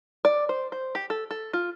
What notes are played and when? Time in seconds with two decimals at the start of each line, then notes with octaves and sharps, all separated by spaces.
0.25 D5
0.49 C5
0.72 C5
0.95 G4
1.10 A4
1.31 A4
1.53 F4